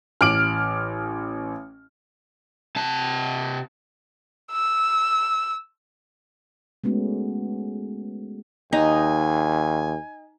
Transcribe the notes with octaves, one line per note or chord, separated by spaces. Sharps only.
A1 D6 F6 D7 F#7
C3 A5
E6
G#3 A3 B3 C#4 F#4
D#2 D#4 G#5